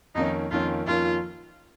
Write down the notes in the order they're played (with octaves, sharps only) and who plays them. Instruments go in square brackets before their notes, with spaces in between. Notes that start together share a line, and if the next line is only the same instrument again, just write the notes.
[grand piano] F2 D#3 A#3 C#4 [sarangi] D#4
[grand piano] F2 D#3 A#3 C#4 [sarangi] F4
[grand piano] F2 D#3 A#3 C#4 [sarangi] F4